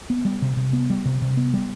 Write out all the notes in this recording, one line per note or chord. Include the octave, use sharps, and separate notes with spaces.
B3
G3
C3
C3
B3
G3
C3
C3
B3
G3